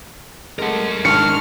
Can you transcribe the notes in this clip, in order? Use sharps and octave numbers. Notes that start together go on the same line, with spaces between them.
G#3 A3 A#4 F#5
G#2 D#3 D4 C#6 F6 C#7